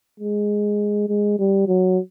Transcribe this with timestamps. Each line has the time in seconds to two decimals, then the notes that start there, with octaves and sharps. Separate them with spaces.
0.20 G#3
1.09 G#3
1.39 G3
1.68 F#3